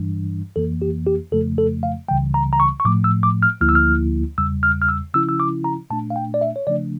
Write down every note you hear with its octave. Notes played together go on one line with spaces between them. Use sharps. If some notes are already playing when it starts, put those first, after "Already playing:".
Already playing: G2 E3 G3 D4
F2 E3 A#3 A4
G4
G4
F2 C#3 F3 A3 A4
A4
F5
C#2 C#3 E3 G3 G5
A#5
A#5
C#6
C#6
A2 F3 A3 D6
E6
D6
F6
D2 D3 F3 A#3 E4 F6
E6
F6
E2 C#3 G3 E6
F6
F6
E6
C#3 F3 C#4 E4 E6
E6
D6
A#5
A#2 A3 D4 A5
F5
G5
D5
E5
C#5
C#3 F3 A3 D4 D5